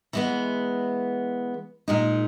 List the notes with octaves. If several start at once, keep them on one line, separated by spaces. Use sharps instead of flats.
E3 G#3 B3
A#2 G#3 D#4